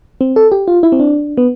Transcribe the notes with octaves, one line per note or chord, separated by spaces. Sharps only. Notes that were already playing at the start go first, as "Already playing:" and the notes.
C4
A4
G4
F4
E4
C4
D4
B3